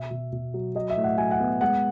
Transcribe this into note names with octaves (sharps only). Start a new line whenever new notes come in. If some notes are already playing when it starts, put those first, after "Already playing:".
Already playing: B2 E5
B2
B2
F#3
F#3 D#5
E5
A2
F#5
F#3 G#5
F#5
B3
G#3 F#5